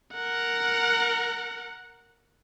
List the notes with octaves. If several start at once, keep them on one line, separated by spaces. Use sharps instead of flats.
A#4 F#5